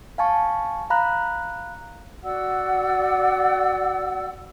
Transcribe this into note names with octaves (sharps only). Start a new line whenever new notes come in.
F5 G#5 A5 C#6
F5 A#5 B5 F#6
F#4 D5 F#5 E6